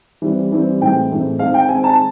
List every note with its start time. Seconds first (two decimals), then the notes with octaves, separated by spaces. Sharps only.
0.22 E3 G3 C4
0.52 E3 G3 C4
0.81 A2 E3 G#3 C4 G5
1.10 A2 E3 G#3 C4
1.39 D#3 G#3 C4 F5
1.54 G5
1.69 D#3 G#3 C4 G#5
1.84 A5